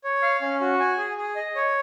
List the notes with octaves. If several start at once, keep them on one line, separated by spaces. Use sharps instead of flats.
C#5
F5
C#4
F#4
G#5
G#4
G#4
D#5
C#5